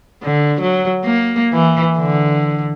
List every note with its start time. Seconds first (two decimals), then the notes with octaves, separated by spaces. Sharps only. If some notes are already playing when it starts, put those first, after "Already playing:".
0.23 D3
0.61 F#3
1.05 A#3
1.54 E3
1.99 D3